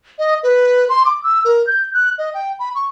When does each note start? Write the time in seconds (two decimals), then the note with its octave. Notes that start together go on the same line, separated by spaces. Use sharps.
0.19 D#5
0.43 B4
0.89 C6
1.05 D6
1.24 E6
1.45 A#4
1.67 G6
1.94 F#6
2.18 D#5
2.34 G5
2.59 B5
2.75 C#6